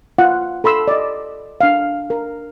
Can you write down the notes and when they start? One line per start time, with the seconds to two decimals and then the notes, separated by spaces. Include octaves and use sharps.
0.18 F4 F#5
0.64 A4 B5 C6 E6
0.88 D5 D#5
1.61 D4 F5
2.10 A#4